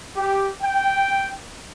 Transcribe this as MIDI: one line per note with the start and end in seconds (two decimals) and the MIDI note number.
0.16 0.48 67
0.61 1.33 79